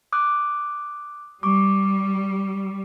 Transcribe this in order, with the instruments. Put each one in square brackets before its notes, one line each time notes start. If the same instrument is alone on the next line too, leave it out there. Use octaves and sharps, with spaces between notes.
[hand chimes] D6 D#6 F#6
[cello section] G3 [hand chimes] C#6 D6